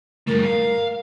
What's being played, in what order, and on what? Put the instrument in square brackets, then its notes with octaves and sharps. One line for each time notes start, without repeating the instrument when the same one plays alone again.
[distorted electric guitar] G2 A3 [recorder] A#4
[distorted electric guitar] F5